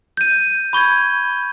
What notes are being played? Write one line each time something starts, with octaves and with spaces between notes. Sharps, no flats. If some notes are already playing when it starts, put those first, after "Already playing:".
G6 D#7
B5 C#6 G6 G#6